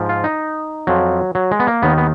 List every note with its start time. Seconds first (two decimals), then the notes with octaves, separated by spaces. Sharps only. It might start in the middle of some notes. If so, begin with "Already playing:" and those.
Already playing: G#2 F3
0.09 F4
0.24 D#4
0.87 F2 F3 F#3
1.35 F#3
1.51 G#3
1.60 B3
1.67 A#3
1.82 D#2 D#3 B3
1.98 B3